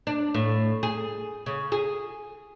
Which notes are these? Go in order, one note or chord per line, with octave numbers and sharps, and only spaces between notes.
D4
A2
G#4
C#3
G#4